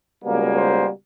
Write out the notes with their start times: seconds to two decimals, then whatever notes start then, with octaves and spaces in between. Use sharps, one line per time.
0.24 C#2 B2 G3 A#3
0.57 C5